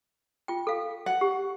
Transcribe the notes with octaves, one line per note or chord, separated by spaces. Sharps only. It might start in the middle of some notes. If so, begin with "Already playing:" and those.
F4 G5
A4 F5
F#5
G4